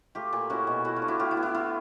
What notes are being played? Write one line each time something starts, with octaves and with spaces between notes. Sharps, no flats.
A3 F4 G4
A#2
C#4 E4 F#4
B2
A3 E4 F#4
F4
D4
E4 F#4
A2 F4 G4
E4 F#4
B3
E4
E4 F4